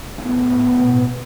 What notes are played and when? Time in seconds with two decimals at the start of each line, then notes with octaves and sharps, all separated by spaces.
0.18 A2 B3
0.79 B2